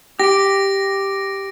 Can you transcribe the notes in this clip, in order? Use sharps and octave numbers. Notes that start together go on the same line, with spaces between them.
G4 A#6 D7